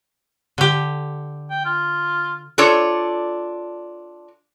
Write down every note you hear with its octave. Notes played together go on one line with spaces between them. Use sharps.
D3 G4
G5
F4
D4 F4 A4 C#5 D5